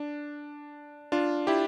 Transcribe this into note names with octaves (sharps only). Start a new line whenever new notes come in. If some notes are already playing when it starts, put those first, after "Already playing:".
Already playing: D4
D4 F4
E4 G4